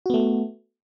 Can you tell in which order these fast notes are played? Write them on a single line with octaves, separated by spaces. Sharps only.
F#4 B3 A3